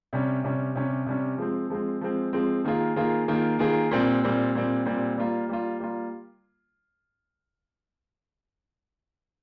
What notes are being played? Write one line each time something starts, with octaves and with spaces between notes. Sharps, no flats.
C3 G3 C#4
C3 G3 C#4
C3 G3 C#4
C3 G3 C#4
F3 G#3 C4
F3 G#3 C4
F3 G#3 C4
F3 G#3 C4
D#3 A#3 F4 G#4
D#3 A#3 F4 G#4
D#3 A#3 F4 G#4
D#3 A#3 F4 G#4
A#2 G3 C4
A#2 G3 C4
A#2 G3 C4
A#2 G3 C4
G3 A#3 F4
G3 A#3 F4
G3 A#3 F4